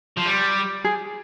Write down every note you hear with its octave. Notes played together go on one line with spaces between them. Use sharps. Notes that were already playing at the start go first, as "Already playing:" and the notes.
F3
G3
G#4